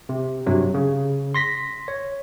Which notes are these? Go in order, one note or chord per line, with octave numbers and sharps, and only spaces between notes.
C3
G2 C3 F#3
C#3
C6 A#6 B6
C#5